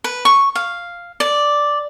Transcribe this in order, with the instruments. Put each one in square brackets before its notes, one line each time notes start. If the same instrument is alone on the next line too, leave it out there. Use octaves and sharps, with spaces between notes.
[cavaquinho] B4
C#6
F5
D5